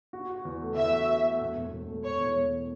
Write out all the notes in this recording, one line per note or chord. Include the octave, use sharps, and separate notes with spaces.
F#4
F#4
E2
A3
E2 E5
F#4
F#4
A3
E1
E1
E1
A3
E1 C#5
E2
E1